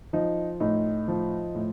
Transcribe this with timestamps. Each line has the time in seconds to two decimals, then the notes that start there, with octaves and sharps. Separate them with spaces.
0.13 F3 D#4
0.60 A2 D#4
1.08 F3
1.55 A2